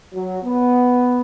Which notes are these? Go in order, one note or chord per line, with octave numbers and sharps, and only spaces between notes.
F#3
B3